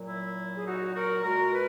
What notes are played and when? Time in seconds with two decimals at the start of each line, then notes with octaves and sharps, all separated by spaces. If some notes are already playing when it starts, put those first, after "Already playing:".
Already playing: A#2 F#3
0.09 E4
0.56 G#4
0.66 D#4 F#4
0.95 F#4 A#4
1.24 A#2 G#3 F#4 A#4
1.53 B4